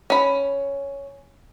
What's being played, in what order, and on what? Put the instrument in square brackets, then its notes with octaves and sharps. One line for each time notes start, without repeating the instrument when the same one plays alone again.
[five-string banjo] C#4 B5